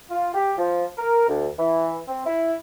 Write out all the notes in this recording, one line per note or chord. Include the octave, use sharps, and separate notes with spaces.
F4
G4
F3
A#4
D2
E3
C4
E4